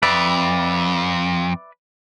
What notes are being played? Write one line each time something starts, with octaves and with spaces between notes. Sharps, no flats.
F2 B4 D5 E5